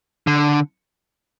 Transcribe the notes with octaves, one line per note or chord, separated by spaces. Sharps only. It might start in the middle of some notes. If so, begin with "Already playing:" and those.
D3